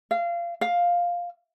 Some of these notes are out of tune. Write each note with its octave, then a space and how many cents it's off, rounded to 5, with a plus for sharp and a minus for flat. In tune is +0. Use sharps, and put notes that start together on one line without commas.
F5 -25
F5 +5